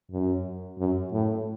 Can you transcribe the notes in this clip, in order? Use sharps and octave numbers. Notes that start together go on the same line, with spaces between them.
F#2
F#2
A2